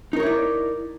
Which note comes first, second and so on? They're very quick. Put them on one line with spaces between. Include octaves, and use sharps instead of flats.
D#4 A#4 C#5 E4 D5